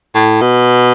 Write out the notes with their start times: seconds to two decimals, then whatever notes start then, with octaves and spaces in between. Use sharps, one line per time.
0.15 A2
0.41 B2